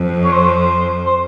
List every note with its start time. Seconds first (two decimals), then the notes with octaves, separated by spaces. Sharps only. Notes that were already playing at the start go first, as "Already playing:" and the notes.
Already playing: F2
0.24 C#5
0.32 C5
1.06 C5